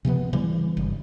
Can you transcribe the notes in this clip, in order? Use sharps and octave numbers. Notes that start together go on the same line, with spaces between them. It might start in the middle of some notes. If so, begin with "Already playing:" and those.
C3 F3 G#3 B3
C#3 E3 G3
G1